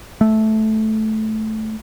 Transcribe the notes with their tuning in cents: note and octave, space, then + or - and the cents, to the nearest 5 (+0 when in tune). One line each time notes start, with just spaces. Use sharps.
A3 -10